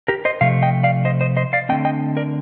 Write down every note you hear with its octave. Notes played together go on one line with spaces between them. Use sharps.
G4 A#4
C5 D#5
C3 F3 A3 F5
D#5 G5
D5 F5
C5 D#5
C5 D#5
C5 D#5
D5 F5
D3 A3 C4 D#5 G5
D#5 G5
A#4 D5